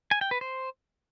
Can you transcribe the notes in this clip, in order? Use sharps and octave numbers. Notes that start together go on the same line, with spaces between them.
G#5
G5
B4
C5